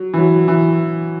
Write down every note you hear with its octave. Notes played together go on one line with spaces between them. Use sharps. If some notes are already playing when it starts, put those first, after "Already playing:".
Already playing: F#3
E3
F#3
E3